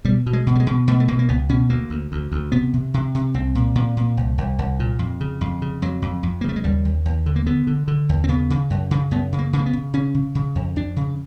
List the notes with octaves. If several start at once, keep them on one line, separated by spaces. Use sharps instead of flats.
B2 G3
B2
G#3
B2
G3
G#3
B2
B2 A3
A3
B2 A#3
A#3
C#2 B3
B2 C#4
D2 A#3
D2
D2
D2
C3 B3
C3
C3
C3
C2 C4
A#2
A#2
A#2
C2
C2
C2
A#2
F2
C#3
F2
C#3
F2 F#3
F2
F2
A#3
C#3 A3
G#3
D#2 G3
D#2
D#2
D3
A#3
D3 B3
D3
D3
D#2
C4
C#3 B3
C#3
F#2
C#3
F#2 B3
C#3
A#3
C#3
A#3
B3
C#3
C#3 C#4
C#3
C#3
F2
F2 D4
C#3